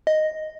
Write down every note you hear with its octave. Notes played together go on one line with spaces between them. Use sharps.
D#5